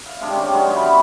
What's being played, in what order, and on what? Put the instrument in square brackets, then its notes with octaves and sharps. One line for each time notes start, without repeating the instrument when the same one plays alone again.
[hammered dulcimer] F5
C3 G#3 D4 G4
D#3 C#4
F#3 G#3 C#4 D#4
E3 B3 G5 B5
C#5